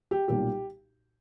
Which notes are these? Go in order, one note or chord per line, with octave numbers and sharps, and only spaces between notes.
G4
B1 A#2 G3 G4